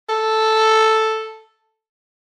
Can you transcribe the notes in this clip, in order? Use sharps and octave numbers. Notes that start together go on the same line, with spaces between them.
A4